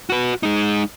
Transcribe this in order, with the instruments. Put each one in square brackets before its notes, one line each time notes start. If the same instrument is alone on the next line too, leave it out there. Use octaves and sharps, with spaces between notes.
[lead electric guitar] F#4 B4
G#3 D#4